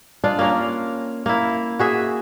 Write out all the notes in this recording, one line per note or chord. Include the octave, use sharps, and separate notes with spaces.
G#3 D4 F4 D5
A#3 C#4 A#4
A#3 E4
F#4 G#4 E5